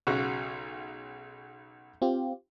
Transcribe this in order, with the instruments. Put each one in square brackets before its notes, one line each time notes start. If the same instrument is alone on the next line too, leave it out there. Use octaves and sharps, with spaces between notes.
[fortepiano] B1 C#3 F#4
[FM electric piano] C4 F4 G4